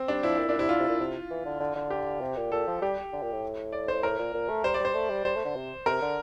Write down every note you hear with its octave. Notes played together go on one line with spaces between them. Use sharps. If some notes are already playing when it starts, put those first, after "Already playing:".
Already playing: C4
G3 D4
F3 E4
A#2
A#2 D4
C3 E4
D3 F4
C3
A#2
C3
E3
D3
D3
D3
G4
C3
A#2
A#2 A4
F3
G3 G4
D3
A#2
A2
D5
C5
A2 A#4
A#2
A#2
A3
G3 C5
D5
G3 C5
A3
G3
G3 C5
A3
D3
C3
C3 A#4
D3